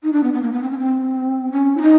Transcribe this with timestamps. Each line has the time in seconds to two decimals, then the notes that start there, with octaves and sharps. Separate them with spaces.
0.03 D#4
0.13 D4
0.23 B3
0.33 B3
0.43 A#3
0.52 B3
0.63 C4
0.71 C#4
0.79 C4
1.52 C#4
1.77 E4
1.82 D#4